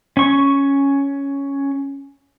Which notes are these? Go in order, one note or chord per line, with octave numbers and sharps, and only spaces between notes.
C#4 C#6